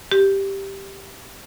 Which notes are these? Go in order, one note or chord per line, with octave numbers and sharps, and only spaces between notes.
G4